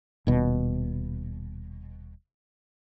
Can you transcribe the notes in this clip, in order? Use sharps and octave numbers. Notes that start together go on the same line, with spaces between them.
D#1 B2